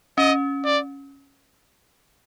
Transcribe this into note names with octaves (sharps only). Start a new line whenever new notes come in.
C#4 D#5
D5